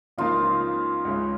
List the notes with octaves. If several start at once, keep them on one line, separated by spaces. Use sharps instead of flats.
C#2 C#3 F3 A#3 D#4 F4
C#2 C#3 G#3 C#4